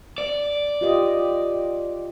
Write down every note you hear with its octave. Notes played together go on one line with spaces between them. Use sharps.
D5
F4 G4 D#5